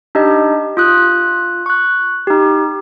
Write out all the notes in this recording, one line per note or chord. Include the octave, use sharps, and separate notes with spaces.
D4 D#4 G4 D#5
F4 D#6 F#6
C#6 F#6
D#4 G4